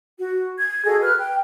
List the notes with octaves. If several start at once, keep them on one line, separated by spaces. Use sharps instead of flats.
F#4
G#6
F#4 G#4 A4 D#5
B4 F6 F#6
G5